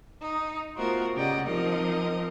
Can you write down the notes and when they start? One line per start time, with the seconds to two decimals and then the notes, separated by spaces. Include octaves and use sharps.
0.21 D#4
0.77 A3 B3 F4 F#4 A#4 C5
1.15 C#3 G4 D5 D#5 F#5
1.46 F3 C4 D#4 A#4 D#5